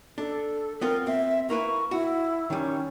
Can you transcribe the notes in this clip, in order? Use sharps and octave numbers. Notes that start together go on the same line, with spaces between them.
D4 A4
B3 C4 F4 A#4
C4 E5
A#3 E4 B4 C#6
E4 F#4
D#3 G3 C#4